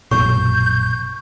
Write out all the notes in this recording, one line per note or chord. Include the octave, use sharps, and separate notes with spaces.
A#1 F#2 B2 C#6 G6